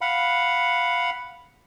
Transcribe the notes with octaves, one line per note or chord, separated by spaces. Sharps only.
F5 F#5 B5